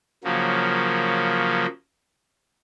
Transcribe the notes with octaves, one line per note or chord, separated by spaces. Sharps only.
C#3 F3 F#3 A#3